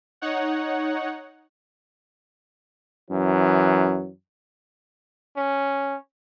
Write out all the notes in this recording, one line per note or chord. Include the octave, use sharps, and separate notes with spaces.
D#4 C#5 F#5
F#2 E3 F#3
C#4